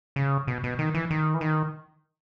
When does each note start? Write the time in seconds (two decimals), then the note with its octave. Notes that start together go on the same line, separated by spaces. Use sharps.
0.16 C#3
0.47 B2
0.64 B2
0.79 D#3
0.94 E3
1.11 D#3
1.34 E3
1.41 D#3